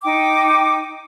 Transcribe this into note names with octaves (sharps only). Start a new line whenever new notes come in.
D#4 G5 D6